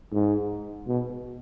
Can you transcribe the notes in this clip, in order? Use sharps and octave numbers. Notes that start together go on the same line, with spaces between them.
G#2
B2